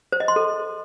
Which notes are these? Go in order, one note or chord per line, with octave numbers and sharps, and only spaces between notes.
C5
D#5
C6
A4